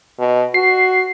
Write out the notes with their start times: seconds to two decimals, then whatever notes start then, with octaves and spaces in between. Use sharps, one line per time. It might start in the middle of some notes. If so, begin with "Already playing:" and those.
0.19 B2
0.54 F#4 C7